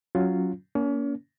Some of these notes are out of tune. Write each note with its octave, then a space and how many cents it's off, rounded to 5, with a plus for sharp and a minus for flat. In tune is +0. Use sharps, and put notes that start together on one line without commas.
F#3 +0 C#4 +5 F4 +0
A#3 +10 C#4 +35